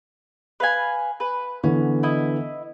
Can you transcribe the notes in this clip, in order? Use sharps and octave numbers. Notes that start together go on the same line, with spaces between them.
B4 F5 G#5
B4
D3 E3 B3 C#4
E4 D#5